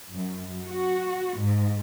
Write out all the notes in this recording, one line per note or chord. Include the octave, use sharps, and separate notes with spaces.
F#2
F#4
G#2